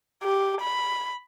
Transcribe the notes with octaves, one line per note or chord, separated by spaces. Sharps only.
G4
B5